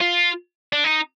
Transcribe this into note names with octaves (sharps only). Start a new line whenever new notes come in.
F4
D4
D#4